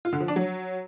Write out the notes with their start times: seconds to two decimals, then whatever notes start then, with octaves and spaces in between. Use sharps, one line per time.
0.05 F4
0.13 D3
0.20 F3
0.28 D4
0.36 F#3